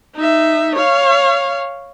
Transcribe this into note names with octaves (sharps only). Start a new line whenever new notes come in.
D#4 E5
C#5 F5